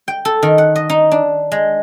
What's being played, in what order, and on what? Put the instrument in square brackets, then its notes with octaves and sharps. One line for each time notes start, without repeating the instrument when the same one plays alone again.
[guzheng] G5
A4
D#3
F#5
D#5
D#4
D4
G#3